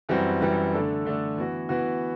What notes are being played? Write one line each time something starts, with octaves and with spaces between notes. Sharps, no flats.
F#2 E3 G3 C4 F#4
F#2 E3 G3 C4 F#4
D3 A3 D4 A4
D3 A3 D4 A4
E3 B3 F#4
E3 B3 F#4